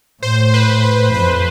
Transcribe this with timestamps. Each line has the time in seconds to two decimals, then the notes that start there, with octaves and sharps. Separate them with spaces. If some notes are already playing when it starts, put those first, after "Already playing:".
0.23 A2 C5
0.54 B4
0.84 C5
1.14 F2 B4